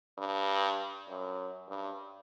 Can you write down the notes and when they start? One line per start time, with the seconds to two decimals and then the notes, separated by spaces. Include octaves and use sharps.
0.18 G2
1.08 F#2
1.68 G2